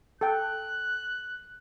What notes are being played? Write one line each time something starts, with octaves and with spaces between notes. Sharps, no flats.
A4 G5 F#6